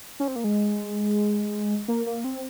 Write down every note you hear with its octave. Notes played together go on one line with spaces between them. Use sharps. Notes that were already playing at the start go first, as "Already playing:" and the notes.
C#4
C4
A#3
G#3
A#3
A#3
C4